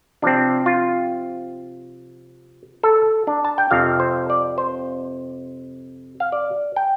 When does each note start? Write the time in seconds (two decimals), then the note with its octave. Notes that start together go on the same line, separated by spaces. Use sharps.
0.22 C3 F3 C4 D4
0.66 F4
2.83 A4
3.27 D4
3.45 A5
3.58 G5
3.71 F2 C3 F3 C4 F5
4.00 C5
4.30 D5
4.58 C5
6.20 F5
6.32 D5
6.76 G5